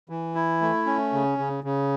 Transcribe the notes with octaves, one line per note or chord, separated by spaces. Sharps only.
E3
E4
A3
C#4
C#3
C#3
C#3